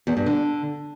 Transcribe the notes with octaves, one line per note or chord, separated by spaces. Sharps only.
E2
G2
D3